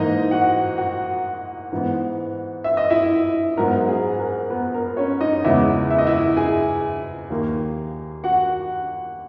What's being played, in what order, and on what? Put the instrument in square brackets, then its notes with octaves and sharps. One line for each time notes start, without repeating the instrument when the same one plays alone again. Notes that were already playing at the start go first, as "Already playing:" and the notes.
Already playing: [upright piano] G#2 E3 A#3 D#4 D#5
F#4 F#5
F#4 F#5
G#2 E3 B3
E5
D#5
E4 E5
G#2 F#3 B3 A#4
G#4
A#4
B3 B4
A#4
C#4 C#5
D#4 D#5
E2 C#3 G#3 B3 E4 E5
E5
D#5
E4 E5
G#4 G#5
D#2 D#3 A#3
F#4 F#5